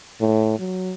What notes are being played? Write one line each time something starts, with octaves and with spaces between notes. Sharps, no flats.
A2
F#3